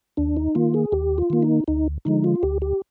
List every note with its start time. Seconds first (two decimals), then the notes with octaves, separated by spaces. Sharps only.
0.17 D#2 D4
0.37 D#4
0.55 D#3 A#3 F4
0.74 G#4
0.92 D#2 G4
1.18 F4
1.30 D#3 A#3
1.42 D#4
1.68 D2 D#4
2.05 D3 F3 G#3 D#4
2.24 F4
2.43 D2 G4
2.62 G4